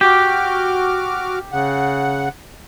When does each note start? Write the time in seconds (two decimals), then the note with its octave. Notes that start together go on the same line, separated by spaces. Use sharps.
0.01 F#4 G4 D6 F6
1.52 C#3 F#5